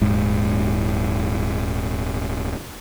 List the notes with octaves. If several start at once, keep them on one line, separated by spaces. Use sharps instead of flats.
D#1 G#2